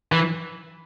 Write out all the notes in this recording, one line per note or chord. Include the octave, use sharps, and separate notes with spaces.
E3